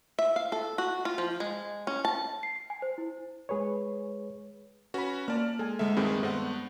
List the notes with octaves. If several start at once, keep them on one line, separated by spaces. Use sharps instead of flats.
E5
F5
A4
F#4
F4
F3
G#3
C#4
A5
C7
C7
G#5
C5
E4
G#3 G#4 B4 C#5
C#4 F#4 B4 B5
A#3 D5 A5 F6
G#3 A4 G#5
D2 G#3 A4 E5
G2 D#3 C4 D4 G#4 B4
G2 B3 A4 C5 E5 F#5